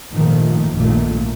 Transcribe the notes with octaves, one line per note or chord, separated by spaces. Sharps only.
G#1 G2 A#2 D#3 F3 A3
A#1 F#2 A#2 D#3 A3